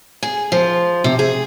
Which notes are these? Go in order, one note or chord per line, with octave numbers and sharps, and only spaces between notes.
G#4
F3
C3
G#4